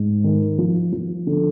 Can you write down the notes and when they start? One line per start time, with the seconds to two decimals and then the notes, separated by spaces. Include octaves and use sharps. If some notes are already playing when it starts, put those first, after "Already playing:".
Already playing: G#2
0.24 D#3
0.58 F3
0.92 F3
1.27 D3